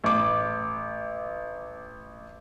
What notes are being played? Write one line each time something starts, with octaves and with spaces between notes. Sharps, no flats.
A1 D6